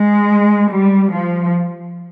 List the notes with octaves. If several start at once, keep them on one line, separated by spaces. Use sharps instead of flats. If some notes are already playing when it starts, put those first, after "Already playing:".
Already playing: G#3
G3
F3